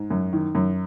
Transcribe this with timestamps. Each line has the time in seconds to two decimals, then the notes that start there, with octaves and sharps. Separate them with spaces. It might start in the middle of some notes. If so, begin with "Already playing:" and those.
Already playing: G#2
0.11 F#2
0.33 D#3
0.55 F#2